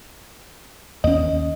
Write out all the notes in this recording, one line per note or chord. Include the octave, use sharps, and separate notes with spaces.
D#2 C#4 D#5